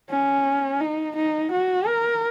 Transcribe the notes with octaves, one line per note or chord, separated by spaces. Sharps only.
C#4
D#4
D#4
F#4
A#4